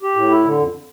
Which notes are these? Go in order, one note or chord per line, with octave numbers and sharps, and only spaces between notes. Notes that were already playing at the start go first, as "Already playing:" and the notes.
G4
A2
E4
D3
F2